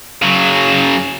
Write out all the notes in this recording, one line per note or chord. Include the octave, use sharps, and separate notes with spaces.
C#3 F#3